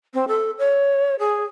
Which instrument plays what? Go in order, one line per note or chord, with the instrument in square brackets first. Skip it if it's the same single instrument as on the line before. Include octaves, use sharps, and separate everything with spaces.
[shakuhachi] C4
A4
C#5
G#4